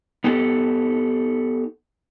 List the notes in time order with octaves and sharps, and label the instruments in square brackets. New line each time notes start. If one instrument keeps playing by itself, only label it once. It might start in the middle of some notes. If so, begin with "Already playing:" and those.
[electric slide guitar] B3 D#4 G4 A4